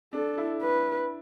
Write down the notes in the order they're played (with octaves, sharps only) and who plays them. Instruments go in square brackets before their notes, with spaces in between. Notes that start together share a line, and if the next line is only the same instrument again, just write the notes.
[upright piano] D4 [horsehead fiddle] A4
[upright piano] E4
[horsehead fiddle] B4